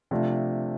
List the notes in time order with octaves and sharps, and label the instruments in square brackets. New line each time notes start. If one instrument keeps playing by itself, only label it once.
[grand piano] C3 F3 A3 D4 F4